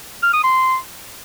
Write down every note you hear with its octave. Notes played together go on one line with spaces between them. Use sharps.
F6
D#6
C6